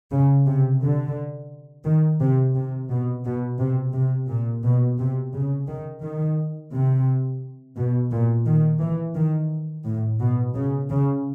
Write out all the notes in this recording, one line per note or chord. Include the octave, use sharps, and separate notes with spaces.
C#3
C3
D3
D#3
C3
C3
B2
B2
C3
C3
A#2
B2
C3
C#3
D#3
D#3
C3
B2
A#2
D#3
E3
D#3
A2
B2
C#3
C#3